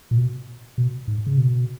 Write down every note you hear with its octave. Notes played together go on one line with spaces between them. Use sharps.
A#2
B2
B2
G#2
C#3
B2